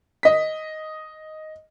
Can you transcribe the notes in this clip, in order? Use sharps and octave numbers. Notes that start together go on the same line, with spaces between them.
D#5 B6